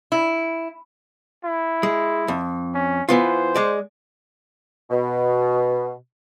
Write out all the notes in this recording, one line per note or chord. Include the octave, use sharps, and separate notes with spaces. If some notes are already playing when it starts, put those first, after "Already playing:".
E4
E4
G#3
F2
C#4
E3 B3 F4 C5
G#3 D5
B2